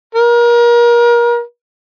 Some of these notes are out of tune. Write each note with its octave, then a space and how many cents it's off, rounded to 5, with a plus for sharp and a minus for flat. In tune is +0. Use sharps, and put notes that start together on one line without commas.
A#4 +30